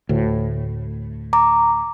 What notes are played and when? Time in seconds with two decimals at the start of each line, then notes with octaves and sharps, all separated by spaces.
0.09 D2 A2
1.33 A#5 D6